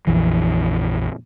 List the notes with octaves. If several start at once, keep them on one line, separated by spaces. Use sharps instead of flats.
A#1 F2 E3